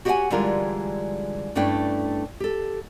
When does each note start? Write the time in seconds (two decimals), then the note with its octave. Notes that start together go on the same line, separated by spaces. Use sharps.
0.05 F#4 G4 C#5 D5 F#5 G#5
0.30 D3 E3 G3 G#3 F4 A#4
1.55 G2 A3 C#4 D4 E4 G5
2.40 G4 A4